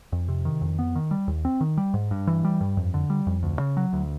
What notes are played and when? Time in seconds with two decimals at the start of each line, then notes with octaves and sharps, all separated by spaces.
0.12 F2
0.28 C3
0.45 D#3
0.61 F2
0.79 B3
0.95 D#3
1.11 G3
1.28 D#2
1.45 C4
1.61 D#3
1.78 G3
1.94 G#2
2.11 G2
2.27 E3
2.44 G3
2.61 G2
2.77 F2
2.94 D3
3.10 G3
3.27 F2
3.43 D2
3.60 C#3
3.77 F#3
3.93 D2